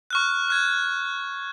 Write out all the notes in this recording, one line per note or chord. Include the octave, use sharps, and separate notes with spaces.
C#6 F6 F#6
F6 F#6 G#6